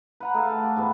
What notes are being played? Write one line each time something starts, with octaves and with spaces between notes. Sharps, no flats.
B4 F#5 A#5
A3 G#4 A4 F5
F5
G4
G#2 E3 B3